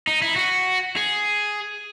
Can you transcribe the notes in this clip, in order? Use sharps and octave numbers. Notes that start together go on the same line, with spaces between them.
D#4
E4
F#4
G#4